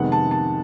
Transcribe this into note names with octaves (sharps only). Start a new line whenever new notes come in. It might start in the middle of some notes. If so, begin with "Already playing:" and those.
Already playing: F2 C3 D#3 G#3 B3 F#5
A5
A5